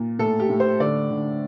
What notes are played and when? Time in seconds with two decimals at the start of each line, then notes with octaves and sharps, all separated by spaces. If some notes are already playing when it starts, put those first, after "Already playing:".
Already playing: A#2
0.19 A2 A4
0.40 G4
0.50 A2
0.60 C5
0.80 D3 D5
1.10 D3